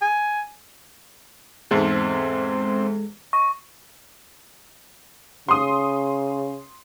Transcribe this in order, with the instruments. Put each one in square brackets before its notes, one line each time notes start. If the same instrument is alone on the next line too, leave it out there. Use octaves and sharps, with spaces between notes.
[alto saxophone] G#5
[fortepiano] E2 G#2 [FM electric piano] G#3 A4 [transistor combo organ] C4
[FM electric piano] D#5 [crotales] C#6
[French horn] C#3 [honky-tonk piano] C6 D#6